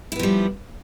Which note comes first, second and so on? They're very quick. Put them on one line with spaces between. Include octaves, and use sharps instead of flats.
E4 B3 F3 G3